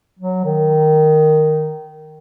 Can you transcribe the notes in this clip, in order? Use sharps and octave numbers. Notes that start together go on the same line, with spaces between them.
F#3
D#3